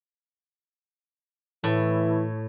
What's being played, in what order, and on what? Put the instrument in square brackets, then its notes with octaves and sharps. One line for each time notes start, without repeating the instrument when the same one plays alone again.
[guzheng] A2 [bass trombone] E3